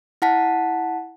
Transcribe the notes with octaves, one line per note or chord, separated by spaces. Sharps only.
E4 F#5 A5 B6